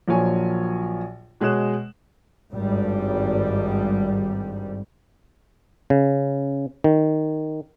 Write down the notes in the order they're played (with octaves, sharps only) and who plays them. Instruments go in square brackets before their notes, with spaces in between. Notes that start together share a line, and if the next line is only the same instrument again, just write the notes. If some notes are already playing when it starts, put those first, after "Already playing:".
[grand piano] A#1 F3 F#3 A#3 C#5 G#5
B2 G#3 G#4 C#5 F#6 E7
[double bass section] G#1 G2 G3
[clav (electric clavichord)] C#3
D#3